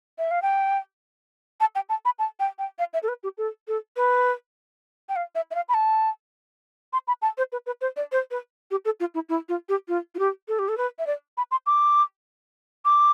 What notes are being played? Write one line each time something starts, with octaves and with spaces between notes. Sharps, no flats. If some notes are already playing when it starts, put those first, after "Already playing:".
E5
F5
G5
A5
G5
A5
B5
A5
G5
G5
F5
E5
A4
B4
G4
A4
A4
B4
G5
F5
E5
E5
F5
B5
A5
C6
B5
A5
C5
B4
B4
C5
D5
C5
B4
G4
A4
F4
E4
E4
F4
G4
F4
F4
G4
A4
G4
A4
B4
E5
D5
B5
C6
D6
D6